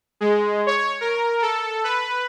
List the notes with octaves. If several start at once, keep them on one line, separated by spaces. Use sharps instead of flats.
G#3
C#5
A#4
A4
B4